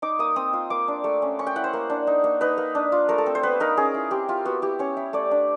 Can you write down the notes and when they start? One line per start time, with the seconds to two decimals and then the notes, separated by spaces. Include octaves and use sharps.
0.02 D#4 D6
0.19 A#3 D#6
0.36 C4 D#6
0.53 F4
0.70 A#3 D6
0.88 D4
1.04 A3
1.22 C#4
1.39 C#4 C#6
1.47 G5
1.56 E4 F#5
1.64 C5
1.73 A#3
1.90 D4
2.07 D#4
2.24 A#3
2.41 D#4 B4
2.58 A#3
2.75 D4
2.92 F4
3.09 A3 A#4
3.18 A4
3.26 C4
3.35 C5
3.43 B3 B4
3.60 D#4 A#4
3.77 C#4 G#4
3.94 E4
4.11 C4 G4
4.28 E4 F4
4.45 B3 F#4
4.62 E4 G4
4.79 C#4 C#5
4.97 E4
5.13 A3 D5
5.31 D4